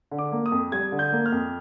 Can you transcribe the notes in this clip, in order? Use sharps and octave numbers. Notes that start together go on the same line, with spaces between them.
D3
D6
A#3
D#6
F2
G3 G#6
D3
G6
A#3
F6
F2